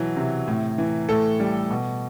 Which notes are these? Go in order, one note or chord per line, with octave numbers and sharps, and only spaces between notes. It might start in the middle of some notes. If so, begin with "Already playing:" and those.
Already playing: B2 E3 F#3
C3
A2
E3
A2 A4
G3
B2